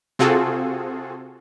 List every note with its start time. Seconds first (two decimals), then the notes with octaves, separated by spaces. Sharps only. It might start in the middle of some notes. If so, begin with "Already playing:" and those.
0.19 C3 C4 F4 F#4 G#4 A4